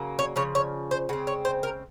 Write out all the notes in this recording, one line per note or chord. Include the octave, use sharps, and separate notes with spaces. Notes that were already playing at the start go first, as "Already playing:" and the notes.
Already playing: C#3 F#3 A#3
C#5
C#3 F3 C#5
C#5
C5
C#3 G#3 C4 F#4
C#5
C5
A#4